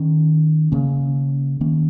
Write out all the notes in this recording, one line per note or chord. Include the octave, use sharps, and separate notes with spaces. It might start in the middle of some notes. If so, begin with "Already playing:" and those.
Already playing: D#3 C#4
C#3 A#3 C#4
D#3 A#3 C#4